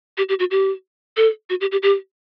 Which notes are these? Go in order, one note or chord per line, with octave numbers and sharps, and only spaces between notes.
G4
G4
F#4
G4
A4
F#4
G4
G4
G4